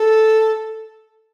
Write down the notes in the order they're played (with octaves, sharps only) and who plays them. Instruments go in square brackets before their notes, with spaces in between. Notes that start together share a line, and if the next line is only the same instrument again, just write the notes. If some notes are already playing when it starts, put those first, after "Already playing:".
Already playing: [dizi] A4